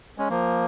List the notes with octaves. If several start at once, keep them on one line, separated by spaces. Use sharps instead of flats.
G#3 C#4
F3 A#3